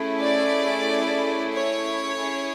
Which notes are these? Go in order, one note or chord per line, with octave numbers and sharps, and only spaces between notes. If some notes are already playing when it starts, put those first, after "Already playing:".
Already playing: A3 C#4 E4 G#4
D5
C#5
C#4 E4 G#4